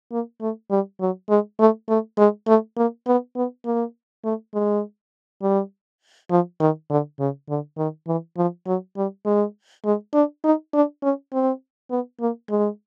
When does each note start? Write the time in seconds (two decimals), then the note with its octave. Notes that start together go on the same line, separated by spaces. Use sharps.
0.12 A#3
0.41 A3
0.71 G3
1.00 F#3
1.29 G#3
1.59 A3
1.89 A3
2.18 G#3
2.47 A3
2.77 A#3
3.07 B3
3.36 B3
3.65 A#3
4.25 A3
4.54 G#3
5.42 G3
6.30 F3
6.60 D#3
6.90 D3
7.19 C#3
7.49 D3
7.78 D#3
8.07 E3
8.37 F3
8.67 F#3
8.97 G3
9.26 G#3
9.85 G#3
10.14 D4
10.44 D#4
10.74 D4
11.03 C#4
11.33 C4
11.91 B3
12.20 A#3
12.50 G#3